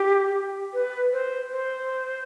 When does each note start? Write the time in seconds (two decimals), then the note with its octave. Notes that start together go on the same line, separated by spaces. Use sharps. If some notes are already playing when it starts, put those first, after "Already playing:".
Already playing: G4
0.74 B4
1.13 C5
1.51 C5